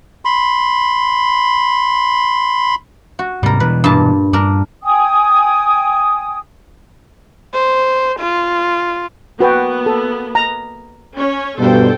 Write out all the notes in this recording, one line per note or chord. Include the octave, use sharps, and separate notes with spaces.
B5 C6
F#4
G#2 C3 G3 A#4
B2 E3 B4
G2 A#2 A5
G2 D4 A#4
G5 G#5 D#6
C5
F4
A#3 B3 F#4 B4 G5
A4
A#5
C#4 C#5
G2 B2 A4 C5 G5